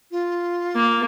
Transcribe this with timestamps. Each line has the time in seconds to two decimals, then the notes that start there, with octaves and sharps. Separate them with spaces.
0.11 F4
0.75 A#3